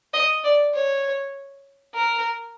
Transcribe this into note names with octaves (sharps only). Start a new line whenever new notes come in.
D#5
D5
C#5
A#4